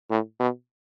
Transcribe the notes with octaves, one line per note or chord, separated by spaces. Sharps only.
A2
B2